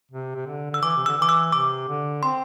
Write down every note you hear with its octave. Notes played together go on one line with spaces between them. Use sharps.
C3
C3
D3
D3 E6
E3 D6
C3
D3 E6
E3 D6
E6
C3 D6
D3
C4 C6